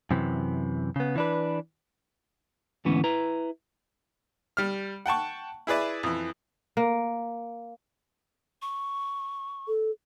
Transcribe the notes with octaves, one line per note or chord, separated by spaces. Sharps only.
F#2 C3 E3
C#3 B3
E3 D4 B4
D2 G#2 E3 B3 C#4
E4 B4 A#5
G3 F6
F#5 G5 A5 C#6
E4 G#4 B4 D5 E5
F2 E3
A#3
C#6
A4